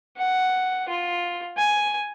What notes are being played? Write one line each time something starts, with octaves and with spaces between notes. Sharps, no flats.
F#5
F4
G#5